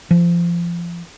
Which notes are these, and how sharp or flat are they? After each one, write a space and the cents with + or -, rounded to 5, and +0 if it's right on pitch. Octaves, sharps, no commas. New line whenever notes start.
F3 -25